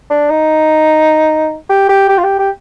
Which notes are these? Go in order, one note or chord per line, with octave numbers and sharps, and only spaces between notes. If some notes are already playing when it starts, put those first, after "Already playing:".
D4
D#4
G4
G4
G4
F4
G4
G4